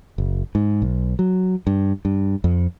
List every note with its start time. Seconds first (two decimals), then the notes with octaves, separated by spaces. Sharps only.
0.18 F#1
0.55 G#2
0.82 B1
1.19 F#3
1.67 G2
2.05 G2
2.44 F2